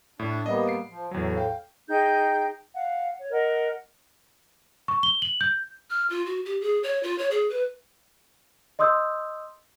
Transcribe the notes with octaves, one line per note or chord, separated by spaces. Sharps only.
A2 D4
G3 A#3 B3 D#5
C7 D7
F3
E2 A2 F#3
F5 G5
D#4 G#4 G5 G6
F5 F#5
C#5
A#4 D#5 F#5
C#6
G7
F#7
G6
F6
F4
F#4
G4
G#4
C#5
F4
C#5
G#4
B4
D#5 C6 D#6 E6 G6